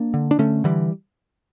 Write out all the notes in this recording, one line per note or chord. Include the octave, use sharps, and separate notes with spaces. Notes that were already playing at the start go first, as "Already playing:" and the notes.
Already playing: A#3 D4
D3
D4
D3 A3 C#4
D3 E3 G3